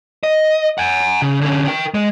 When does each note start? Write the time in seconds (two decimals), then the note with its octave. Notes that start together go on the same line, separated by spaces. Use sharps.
0.23 D#5
0.78 F#5 G#5
1.22 C#3
1.41 D3 C#4
1.68 A#4 G5
1.94 G#3